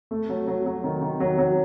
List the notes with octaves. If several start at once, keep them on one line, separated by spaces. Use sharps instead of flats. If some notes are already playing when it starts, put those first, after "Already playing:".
A3
F#3
F#3
F#3
D#3
D#3
F#3
F#3